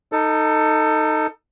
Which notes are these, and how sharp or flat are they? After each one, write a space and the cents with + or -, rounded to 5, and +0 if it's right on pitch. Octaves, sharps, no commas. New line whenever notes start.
D#4 +0 A4 +20